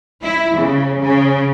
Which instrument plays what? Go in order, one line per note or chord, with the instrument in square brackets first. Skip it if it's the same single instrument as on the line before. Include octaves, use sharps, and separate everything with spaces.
[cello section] E4
C#3
C#3